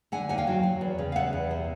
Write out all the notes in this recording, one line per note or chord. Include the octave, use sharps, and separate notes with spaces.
D3 F#5 G#5
D#2 F#5 G#5
F5 G5
F#3
F#3
E2
C#3
F5
E2 E5 F#5
E2
C3